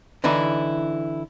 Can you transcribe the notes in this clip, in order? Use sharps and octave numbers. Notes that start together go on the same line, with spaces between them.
D3 E3 D#4 E4